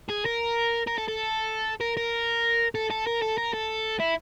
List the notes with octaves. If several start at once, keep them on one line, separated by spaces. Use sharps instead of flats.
G#4
A#4
A#4
A4
A4
A#4
A#4
A4
A4
A#4
A4
A#4
A4
E4